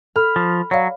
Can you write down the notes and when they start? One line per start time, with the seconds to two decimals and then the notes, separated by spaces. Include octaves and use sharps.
0.16 A4 B5 F6
0.36 F3
0.71 F#3 C#5 D5 F5